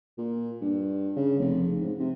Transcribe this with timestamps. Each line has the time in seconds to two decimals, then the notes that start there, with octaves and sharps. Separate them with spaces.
0.18 A#2
0.61 G2
1.16 C#3
1.40 F1
1.80 G#2
1.99 C3